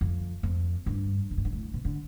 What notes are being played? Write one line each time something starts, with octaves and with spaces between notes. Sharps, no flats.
F2
F2
G2
B2
A2
G2
A2
B2
D3